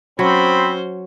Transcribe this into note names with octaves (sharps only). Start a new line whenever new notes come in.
F#3 C4 C#4 C5 B5